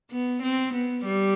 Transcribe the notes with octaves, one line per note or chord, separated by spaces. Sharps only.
B3
C4
B3
G3